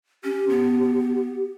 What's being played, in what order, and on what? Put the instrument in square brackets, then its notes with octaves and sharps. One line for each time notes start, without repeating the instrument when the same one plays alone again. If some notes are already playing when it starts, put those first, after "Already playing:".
[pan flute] C#4 [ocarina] G4
[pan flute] B3